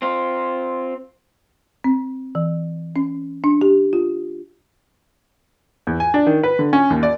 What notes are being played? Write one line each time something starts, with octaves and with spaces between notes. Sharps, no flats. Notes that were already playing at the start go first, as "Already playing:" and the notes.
C4 F4
C4
E3
C#4
D4
G4
F4
E2
G#5
D4
D#3
B4
D3
C#4
D#2
D5